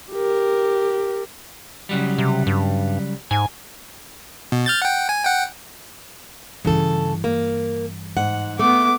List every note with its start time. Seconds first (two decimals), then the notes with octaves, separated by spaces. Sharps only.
0.13 G4 A#4
1.89 C#3 F#3 G3
2.18 C3
2.47 G2
3.31 G#2 G#5
4.52 B2
4.66 F6 G6 A6
4.82 F#5 G5
5.09 G#5
5.24 F#5 G5
6.65 G2 C#3 E3 A4
7.24 A#3
8.17 G#2 F#5
8.59 A3 B3 D6